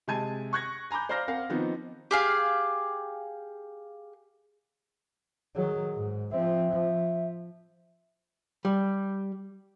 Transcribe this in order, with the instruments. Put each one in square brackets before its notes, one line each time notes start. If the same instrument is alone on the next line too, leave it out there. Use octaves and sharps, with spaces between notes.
[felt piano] C3 G#3 G#5 A5 G#6 D#7
C#6 F#6 G#6 A#6
G#5 A#5 B5 D6 G6
C5 D5 F5 A#5 F6 A#6
C4 A#4 F5 F#5
D#3 F3 B3 C4 D#4
[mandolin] G4 G#4 F5
[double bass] D#3 F#3 [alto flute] G#4
[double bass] G#2
[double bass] F3 C4 [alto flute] E5
[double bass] F3
[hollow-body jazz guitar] G3